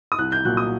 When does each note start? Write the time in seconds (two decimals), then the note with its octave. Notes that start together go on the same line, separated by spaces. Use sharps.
0.12 D#6
0.19 C2 F#6
0.32 G6
0.45 A#2 F#3 F#6
0.57 D#6